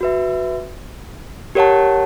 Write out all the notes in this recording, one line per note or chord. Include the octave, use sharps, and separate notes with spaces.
F#4 B4 E5
G4 A#4 C#5 F#5 A5